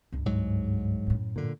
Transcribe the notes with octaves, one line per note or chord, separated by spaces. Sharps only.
C#2 G2
G#2 F#3
F#2 A2
A#2 D3